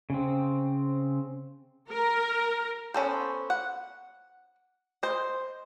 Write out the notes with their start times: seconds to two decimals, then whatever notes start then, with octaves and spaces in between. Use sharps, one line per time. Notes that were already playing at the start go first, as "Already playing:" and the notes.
0.10 C#3 C4
1.90 A#4
2.94 B3 C#4 A4 C5
3.50 F#5
5.03 C5 D#5